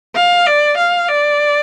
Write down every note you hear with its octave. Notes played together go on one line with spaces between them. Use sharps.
F5
D5
F5
D5